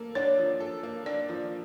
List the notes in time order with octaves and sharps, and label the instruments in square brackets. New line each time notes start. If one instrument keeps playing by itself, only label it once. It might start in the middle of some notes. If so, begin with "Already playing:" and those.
Already playing: [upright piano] A#3 A4
[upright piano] D4 [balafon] C#5
[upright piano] F3
A4
A#3
[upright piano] D4 [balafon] D5
[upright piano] F3